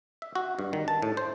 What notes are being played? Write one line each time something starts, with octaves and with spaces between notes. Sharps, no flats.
E5
F#4
G2
D#3
A5
A2
C5